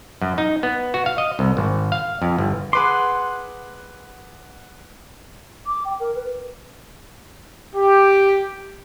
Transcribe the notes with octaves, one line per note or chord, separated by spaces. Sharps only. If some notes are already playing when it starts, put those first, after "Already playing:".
F#2
D#4
B3
F#4
F5
D#5
C2
G#1
F5
F2
G1
G#4 B4 F#5 C6 D6
D6
G5
A#4
B4
G4